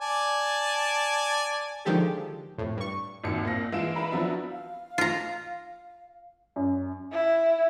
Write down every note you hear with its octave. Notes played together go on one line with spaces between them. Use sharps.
D5 G#5 A5
D3 D#3 F3 G#3 G4 A4
F2 A2
G2 C#6
G#1 D#2 A#2 E4 C#7
A#2 C4 F5 A#6
E3 G#3 F4 C7 D7 E7
B4 E5 A#5 B5
F3 F#3 B3 D4 E4 F#4
F5
F4 A#5
F#2
E4